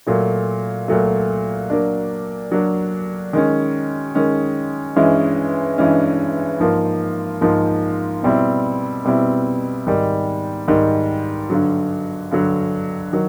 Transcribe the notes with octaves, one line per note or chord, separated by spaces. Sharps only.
A#2 F#3 A3
A#2 F#3 A3
F#3 A#3 D4
F#3 A#3 D4
D#3 G#3 C#4
D#3 G#3 C#4
G2 E3 G#3 C#4
G2 E3 G#3 C#4
G#2 F3 A#3
G#2 F3 A#3
B2 G3 C4 E4
B2 G3 C4 E4
G#2 D#3 G3
G#2 D#3 G3
G2 D3 F#3
G2 D3 F#3
D#3 F#3